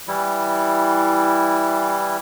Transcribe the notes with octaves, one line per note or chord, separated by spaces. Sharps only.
E3 G3 E4